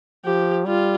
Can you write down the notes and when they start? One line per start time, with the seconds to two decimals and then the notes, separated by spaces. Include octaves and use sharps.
0.25 F3 G4
0.66 G3 F4